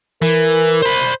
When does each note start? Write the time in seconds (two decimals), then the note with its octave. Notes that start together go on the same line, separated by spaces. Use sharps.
0.22 E3 A#4
0.82 C5 B5